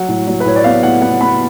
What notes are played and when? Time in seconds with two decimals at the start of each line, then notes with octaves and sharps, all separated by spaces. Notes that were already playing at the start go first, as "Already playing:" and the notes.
Already playing: F#3 F#5
0.08 A2
0.27 F#3
0.40 B4
0.46 A2 C#5
0.56 D5
0.64 B3 F5
0.83 A2 F#5
1.02 B3 F#5
1.21 B3 B5